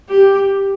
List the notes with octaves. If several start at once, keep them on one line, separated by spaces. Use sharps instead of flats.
G4